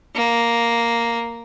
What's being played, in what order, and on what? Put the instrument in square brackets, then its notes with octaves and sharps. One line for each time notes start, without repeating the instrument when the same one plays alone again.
[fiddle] A#3